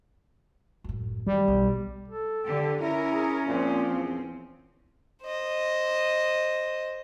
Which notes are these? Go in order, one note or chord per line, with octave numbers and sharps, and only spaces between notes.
F#2 A2
D#3 G3
B1
A4
D3 G4
C#4 E4 A#4
G#4
A#2 F3 C4
E2
C5 D#5